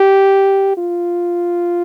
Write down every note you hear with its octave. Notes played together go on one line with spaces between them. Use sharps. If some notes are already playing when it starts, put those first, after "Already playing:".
Already playing: G4
F4